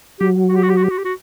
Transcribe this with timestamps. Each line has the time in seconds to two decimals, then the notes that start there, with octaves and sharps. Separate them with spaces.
0.20 F#3 G4
0.49 F#4
0.56 G4
0.63 F#4
0.70 G4
0.77 F#4
0.84 G4
0.90 F#4
0.98 G4
1.05 F#4